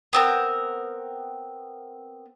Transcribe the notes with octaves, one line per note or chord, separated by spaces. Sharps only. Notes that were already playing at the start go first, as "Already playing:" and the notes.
B3 C4 A#4